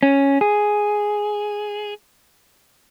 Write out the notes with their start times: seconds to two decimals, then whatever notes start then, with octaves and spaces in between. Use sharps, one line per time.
0.03 C#4
0.41 G#4